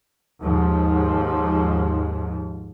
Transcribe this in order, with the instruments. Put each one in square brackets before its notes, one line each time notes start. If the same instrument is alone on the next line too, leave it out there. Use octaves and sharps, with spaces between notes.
[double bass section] D#2 G#2 F3